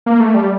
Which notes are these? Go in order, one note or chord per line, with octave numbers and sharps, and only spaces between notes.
A#3
A3
G3